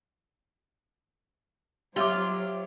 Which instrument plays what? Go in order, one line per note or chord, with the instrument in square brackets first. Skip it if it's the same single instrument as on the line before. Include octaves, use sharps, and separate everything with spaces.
[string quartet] F#3 C5 C#5 [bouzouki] F4 [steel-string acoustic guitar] G4 [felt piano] E5 D6